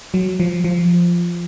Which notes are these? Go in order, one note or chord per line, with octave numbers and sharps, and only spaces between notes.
F#3
F3
F3